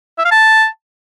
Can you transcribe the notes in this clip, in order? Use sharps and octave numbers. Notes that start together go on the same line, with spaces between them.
E5
F5
A5